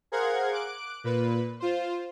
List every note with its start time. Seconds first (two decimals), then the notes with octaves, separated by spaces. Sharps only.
0.12 G#4 A#4 C5 F5 F#5 G#6
0.52 D6 F#6 D7
1.04 A#2 B4
1.60 F4 C5